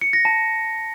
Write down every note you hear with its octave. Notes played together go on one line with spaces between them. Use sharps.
C#7
A#6
A5